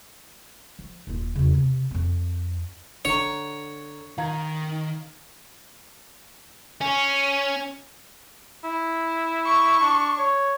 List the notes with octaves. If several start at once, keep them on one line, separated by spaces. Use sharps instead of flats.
F3
D#1 F4
E2 C#3
C3
F2 C4
D3 C#5 A#5
D#3 F5 A#5 G#6
C#4
E4
C#6
D4
C#5